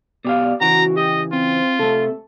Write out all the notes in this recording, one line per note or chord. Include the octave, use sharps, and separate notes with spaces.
B2 G4 D5 F5
C#3 E3 F#4 A#5
G4 D#5
C4 F4
C3 A3 A4